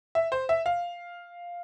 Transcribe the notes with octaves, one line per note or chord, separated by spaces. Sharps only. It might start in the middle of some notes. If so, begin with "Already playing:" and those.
E5
C5
E5
F5